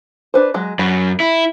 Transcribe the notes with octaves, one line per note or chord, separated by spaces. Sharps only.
D4 B4 C5
F#3 G#3
F#2 B5
E4